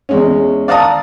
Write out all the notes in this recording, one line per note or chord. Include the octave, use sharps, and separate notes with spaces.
E2 G#3 C#4
D5 F5 F#5 A5 A#5 D#6